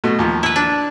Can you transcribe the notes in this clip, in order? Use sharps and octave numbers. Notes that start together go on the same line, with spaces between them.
B2 A3
D#2 F3
E4 B4
D4